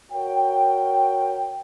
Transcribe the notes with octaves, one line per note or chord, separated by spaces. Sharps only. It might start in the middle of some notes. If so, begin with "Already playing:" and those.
F#4 A#4 C#5 G5